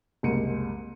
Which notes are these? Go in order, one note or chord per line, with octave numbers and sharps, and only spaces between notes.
F#1 C2 G#3 C#7 D#7